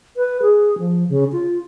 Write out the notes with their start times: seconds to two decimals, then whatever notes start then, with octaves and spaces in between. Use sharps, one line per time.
0.17 B4
0.42 G#4
0.79 F3
1.09 C#3
1.32 F4